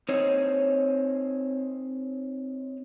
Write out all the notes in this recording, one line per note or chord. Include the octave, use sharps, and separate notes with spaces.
C4 D#4 C5 C#5